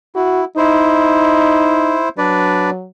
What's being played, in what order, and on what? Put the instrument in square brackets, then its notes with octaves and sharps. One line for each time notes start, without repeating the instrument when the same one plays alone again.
[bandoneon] E4 [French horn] F#4
[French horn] D#4 [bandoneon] E4 C5
[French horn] F#3 [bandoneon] D4 B4 D5